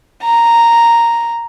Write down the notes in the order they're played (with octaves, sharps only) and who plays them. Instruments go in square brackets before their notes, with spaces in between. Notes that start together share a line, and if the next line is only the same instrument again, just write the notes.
[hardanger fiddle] A#5